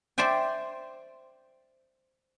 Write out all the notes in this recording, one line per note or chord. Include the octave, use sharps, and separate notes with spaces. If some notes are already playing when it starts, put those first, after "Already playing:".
C5 D5 E5 G5 G#5